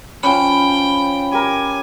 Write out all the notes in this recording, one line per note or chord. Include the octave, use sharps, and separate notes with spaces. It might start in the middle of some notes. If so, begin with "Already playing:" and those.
F3 C#4 G5 B5
G4 A#4 G#5